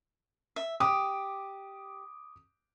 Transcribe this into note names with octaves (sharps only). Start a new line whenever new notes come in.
E5
G4 D6 D#6